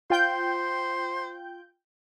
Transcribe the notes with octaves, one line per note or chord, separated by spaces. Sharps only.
F4 C5 G5 G6